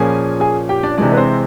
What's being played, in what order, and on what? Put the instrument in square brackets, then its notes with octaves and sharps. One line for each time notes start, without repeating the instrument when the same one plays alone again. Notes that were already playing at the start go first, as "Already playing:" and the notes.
Already playing: [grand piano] A#2 F3 A#3 C#4 G#4 G#5
G#4 G#5
G4 G5
D4 D5
C3 E3 G#3 D4 D5
B4
C4 C5